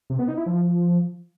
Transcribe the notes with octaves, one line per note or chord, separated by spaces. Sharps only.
C3
B3
D#4
E4
F3